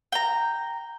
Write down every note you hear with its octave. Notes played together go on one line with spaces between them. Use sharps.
G5 A#5